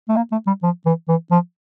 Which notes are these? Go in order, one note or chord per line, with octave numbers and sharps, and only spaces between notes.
A3
A#3
A3
G3
F3
E3
E3
F3